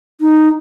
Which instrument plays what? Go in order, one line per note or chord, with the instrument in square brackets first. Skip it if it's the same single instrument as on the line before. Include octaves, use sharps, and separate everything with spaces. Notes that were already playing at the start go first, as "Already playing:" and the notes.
[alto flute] D#4